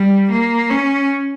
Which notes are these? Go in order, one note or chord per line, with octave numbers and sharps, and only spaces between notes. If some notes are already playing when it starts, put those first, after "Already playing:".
Already playing: G3
A#3
C#4